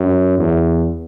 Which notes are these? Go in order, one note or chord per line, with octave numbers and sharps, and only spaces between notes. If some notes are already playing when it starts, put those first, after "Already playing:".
Already playing: F#2
E2